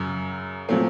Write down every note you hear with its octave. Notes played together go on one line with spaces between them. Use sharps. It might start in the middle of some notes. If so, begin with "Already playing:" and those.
Already playing: F#2 C#3 F#3
A#2 F#3 A3 C4